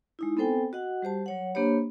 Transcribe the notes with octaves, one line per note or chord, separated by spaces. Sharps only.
G#3 D#4 E4
B3 C4 A4 C5 G5 G#5
F#4 D#5 F#5
G3 G4 C5 A5
F#3 C#5 F#5
A#3 D4 G4 C5 C#5 B5